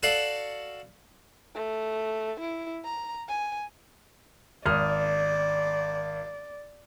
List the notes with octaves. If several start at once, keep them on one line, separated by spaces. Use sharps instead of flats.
F#4 A4 D5 F5 F#5 A5
A3
E4
A#5
G#5
G#1 D5 D#6 F6